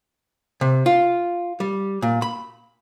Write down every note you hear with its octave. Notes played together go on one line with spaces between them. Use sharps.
C3
F4
G3
A#2
B5